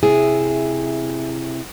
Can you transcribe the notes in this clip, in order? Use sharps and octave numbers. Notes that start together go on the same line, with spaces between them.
C3 E4 G#4